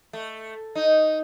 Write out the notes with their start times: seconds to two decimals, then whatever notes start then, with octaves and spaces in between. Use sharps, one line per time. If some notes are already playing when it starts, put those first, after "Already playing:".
0.13 A3
0.75 D#4